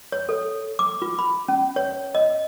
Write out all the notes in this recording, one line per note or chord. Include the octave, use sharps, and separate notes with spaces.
C#5
A4
D6
F4
B5
C#4
C#5
D#5